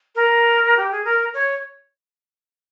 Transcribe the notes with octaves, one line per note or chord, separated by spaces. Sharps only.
A#4
G4
G#4
A#4
C#5